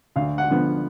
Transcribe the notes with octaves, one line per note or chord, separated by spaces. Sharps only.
D2 F5
F#5
D3 F3 B3